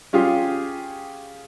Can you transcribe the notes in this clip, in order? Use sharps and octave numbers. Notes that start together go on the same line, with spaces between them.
C#4 F4 G4 G#4